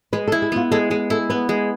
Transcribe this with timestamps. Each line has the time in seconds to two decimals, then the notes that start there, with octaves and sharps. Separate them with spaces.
0.13 G#3 B4
0.28 A4
0.32 E4
0.42 G#4
0.52 B3 F4
0.71 G#3 A4
0.90 G#3 G#4
1.10 E4 A4
1.30 B3 B4
1.49 G#3